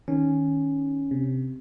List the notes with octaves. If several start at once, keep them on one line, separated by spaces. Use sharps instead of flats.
D#3 C#4
C3